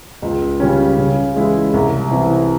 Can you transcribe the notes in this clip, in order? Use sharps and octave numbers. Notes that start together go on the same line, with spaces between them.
C#2
C#3 G3 C#4
C#3
E3 G#3 E4
C2
C3 E3